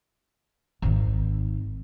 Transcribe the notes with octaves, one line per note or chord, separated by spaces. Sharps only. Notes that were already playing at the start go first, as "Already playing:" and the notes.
G#1 D#3